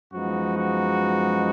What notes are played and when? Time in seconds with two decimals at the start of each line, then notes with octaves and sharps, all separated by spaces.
0.12 F#2 F3 G#3 B3 D#4 F#4
0.57 F#4